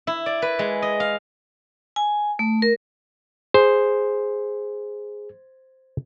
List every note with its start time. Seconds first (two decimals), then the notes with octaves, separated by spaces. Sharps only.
0.07 E4
0.26 D5
0.42 B4
0.59 G#3
0.82 D#5
1.00 F5
1.96 G#5
2.39 A3
2.62 A#4
3.54 G#4 C5